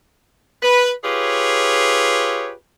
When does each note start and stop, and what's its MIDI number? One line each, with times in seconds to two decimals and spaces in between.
0.63 0.91 71
1.04 2.52 65
1.04 2.52 67
1.04 2.52 68
1.04 2.52 71
1.04 2.52 73